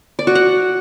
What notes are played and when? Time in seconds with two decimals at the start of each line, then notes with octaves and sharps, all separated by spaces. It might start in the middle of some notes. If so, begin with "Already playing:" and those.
0.19 D5
0.27 F#4
0.35 F#5